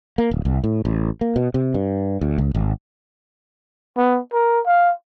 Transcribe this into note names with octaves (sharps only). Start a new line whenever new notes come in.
A#3
D1
C2
A2
A1
A#3
B2
C3
G2
D2
C#2
G#1
B3
A#4
F5